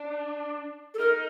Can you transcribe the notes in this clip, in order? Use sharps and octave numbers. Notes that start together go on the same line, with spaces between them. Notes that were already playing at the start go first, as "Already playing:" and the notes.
Already playing: D4
A4
D#4 A#4